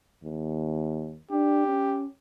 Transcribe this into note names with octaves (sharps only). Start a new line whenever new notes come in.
D#2
D4 G4
C#4